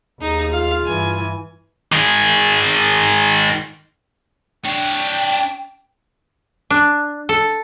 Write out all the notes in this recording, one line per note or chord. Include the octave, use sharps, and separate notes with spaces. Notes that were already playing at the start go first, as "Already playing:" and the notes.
D#2 D#4 G#4
F4 F5
G2 E3 G#5
D#3 G#4
D4 C#5 G5
D4
A4